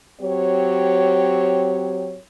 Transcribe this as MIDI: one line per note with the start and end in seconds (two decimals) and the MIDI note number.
0.21 2.18 54
0.21 2.18 60
0.21 2.18 67
0.21 2.18 73